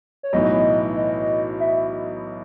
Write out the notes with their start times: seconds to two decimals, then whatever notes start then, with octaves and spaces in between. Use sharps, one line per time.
0.23 C#5
0.33 B1 A2 E3 B3 D#4 D#5
0.96 D#5
1.60 E5